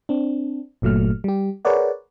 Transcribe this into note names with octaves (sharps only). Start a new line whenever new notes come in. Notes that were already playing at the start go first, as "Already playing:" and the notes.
C4 D4
G1 A#2 F#3 A3 F6
G3 G4
G#4 A#4 B4 C#5 D5 F#5